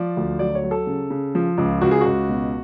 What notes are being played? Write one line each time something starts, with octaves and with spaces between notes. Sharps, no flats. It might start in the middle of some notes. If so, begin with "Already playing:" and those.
Already playing: F3 D5
D2
F#3 D5
C#5
F#3
A4
C#3
C#3
F3
C#2
C#2 F#4
G#4
C#2 F#4
B2